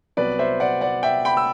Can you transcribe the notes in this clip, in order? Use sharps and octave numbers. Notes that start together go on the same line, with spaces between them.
C2 C3 F#3 B3 B4 D5
C5 E5
D5 F#5
D5 F#5
E5 G5
G5 B5
E6